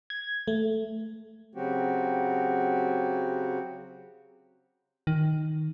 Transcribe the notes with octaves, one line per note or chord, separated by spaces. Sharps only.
G#6
A3
C#3 F#3 C4 F#4 G4
D#3